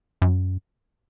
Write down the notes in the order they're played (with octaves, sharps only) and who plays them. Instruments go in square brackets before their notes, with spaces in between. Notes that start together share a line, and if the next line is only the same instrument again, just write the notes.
[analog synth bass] F#2